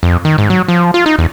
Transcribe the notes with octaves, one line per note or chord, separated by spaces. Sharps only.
F2
D#3
G#2
F#3
F3
F4
D#4
E2